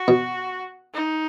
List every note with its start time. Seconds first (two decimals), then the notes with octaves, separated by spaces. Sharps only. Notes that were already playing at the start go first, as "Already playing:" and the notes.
Already playing: F#4
0.08 B2
0.94 D#4